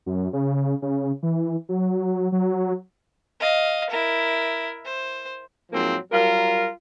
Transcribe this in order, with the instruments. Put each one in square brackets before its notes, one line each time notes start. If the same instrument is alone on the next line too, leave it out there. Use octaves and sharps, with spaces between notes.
[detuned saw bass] F#2
C#3
C#3
E3
F#3
F#3
[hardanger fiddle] D#5 F5
E4 A#4
C5
[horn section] G#2 F3 F#3 A#3 C4
F#3 G3 F4 A#4